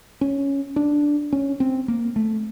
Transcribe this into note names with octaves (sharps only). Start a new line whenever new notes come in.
C#4
D4
C#4
C4
A#3
A3